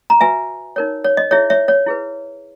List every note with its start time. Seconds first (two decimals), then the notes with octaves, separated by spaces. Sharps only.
0.10 A#5
0.21 F#4 B4 E5 G#5
0.76 D#4 A#4 C#5
1.04 C#5
1.17 D#5
1.31 E4 G#4 C#5 E5
1.50 C#5 E5
1.68 C#5
1.86 E4 G#4 B4